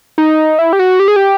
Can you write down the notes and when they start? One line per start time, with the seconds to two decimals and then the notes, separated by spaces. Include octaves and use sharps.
0.18 D#4
0.59 E4
0.73 G4
0.79 F#4
1.00 G4
1.08 G#4
1.16 G4